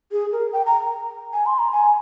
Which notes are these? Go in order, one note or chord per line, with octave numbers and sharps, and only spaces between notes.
G#4
A#4
G5
A#5
G#5
C6
A#5
G#5